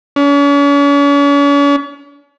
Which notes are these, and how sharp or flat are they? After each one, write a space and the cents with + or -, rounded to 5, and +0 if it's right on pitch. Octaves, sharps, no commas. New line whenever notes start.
C#4 +40